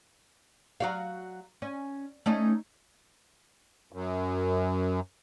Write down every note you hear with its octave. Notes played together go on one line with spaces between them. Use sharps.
F#3 F#4 F5
C#4
A3 C#4 D#4
F#2